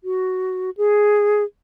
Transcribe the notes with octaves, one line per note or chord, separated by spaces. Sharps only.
F#4
G#4